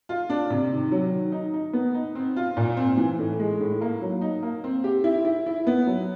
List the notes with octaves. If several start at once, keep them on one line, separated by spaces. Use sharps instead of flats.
F4
D4
C3
D#3
F#3
D#3
D#4
D#4
B3
D#4
C4
F4
A#2
C4
E3
A2
G#3
A2
A#3
F#3
D#4
A#3
C4
G4
E4
E4
E4
B3
F#3